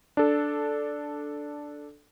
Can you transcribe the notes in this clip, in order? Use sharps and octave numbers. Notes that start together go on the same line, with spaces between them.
D4 A4